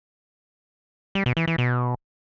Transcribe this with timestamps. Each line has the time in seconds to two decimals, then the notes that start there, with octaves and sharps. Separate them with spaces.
1.15 G3
1.26 B2
1.37 E3
1.47 E3
1.58 B2